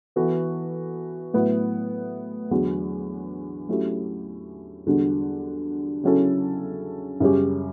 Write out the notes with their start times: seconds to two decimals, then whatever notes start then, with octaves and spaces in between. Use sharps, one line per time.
0.16 E3 B3 F#4 A4
1.33 A2 F#3 B3 E4
2.51 E2 D3 F#3
3.69 F#3 A3 C#4 E4 G4
4.87 E2 D3 G3 D4 F#4
6.04 C#3 F#3 C#4 E4 A4
7.20 F#2 C#3 G3 C#4 G4